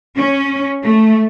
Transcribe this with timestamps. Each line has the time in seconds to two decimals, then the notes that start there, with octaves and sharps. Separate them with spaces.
0.16 C#4
0.83 A3